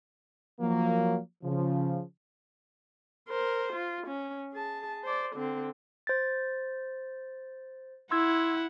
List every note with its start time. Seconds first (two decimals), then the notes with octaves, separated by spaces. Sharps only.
0.60 F3 F#3 A#3
1.44 C#3 F3
3.29 A#4 C5
3.73 F4
4.07 C#4
4.53 G#4 A5
5.04 C5 D5
5.36 D3 C4
6.07 C5 A6
8.11 E4 F#5 C6 E6 G#6